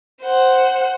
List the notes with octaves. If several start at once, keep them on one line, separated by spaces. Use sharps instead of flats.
C5 F#5